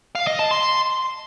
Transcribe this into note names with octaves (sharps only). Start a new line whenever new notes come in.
F5
D#5
A5
C6